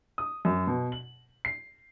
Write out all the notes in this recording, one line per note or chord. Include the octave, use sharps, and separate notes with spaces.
D#6
F#2
B2
F#7
C7